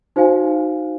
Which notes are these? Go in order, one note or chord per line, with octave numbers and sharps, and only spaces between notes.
D#4 F#4 C5 F5 G#5